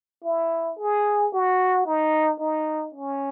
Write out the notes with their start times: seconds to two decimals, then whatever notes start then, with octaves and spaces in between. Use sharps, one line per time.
0.24 E4
0.79 G#4
1.33 F#4
1.86 D#4
2.40 D#4
2.94 C#4